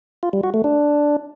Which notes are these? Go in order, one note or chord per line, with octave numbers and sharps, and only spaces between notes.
F4
G3
F#4
A3
D4